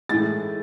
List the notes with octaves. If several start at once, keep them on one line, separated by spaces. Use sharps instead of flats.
A2 E3 G#3 A6